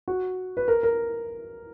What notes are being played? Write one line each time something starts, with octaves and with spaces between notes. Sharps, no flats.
F#4
B4
A#4
A#4